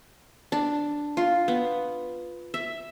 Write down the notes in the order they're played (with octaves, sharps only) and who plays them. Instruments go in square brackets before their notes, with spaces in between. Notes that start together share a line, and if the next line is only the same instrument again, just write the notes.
[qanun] D4
F4
B3
E5